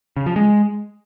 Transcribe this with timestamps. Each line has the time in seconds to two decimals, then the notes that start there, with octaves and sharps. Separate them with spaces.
0.17 C#3
0.26 F3
0.36 G#3